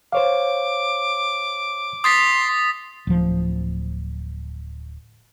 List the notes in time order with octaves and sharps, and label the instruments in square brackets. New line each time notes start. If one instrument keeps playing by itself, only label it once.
[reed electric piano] C5 C#5 F5 [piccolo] D6
[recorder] C6 [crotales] D#6 A6 B6
[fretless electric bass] D1 F3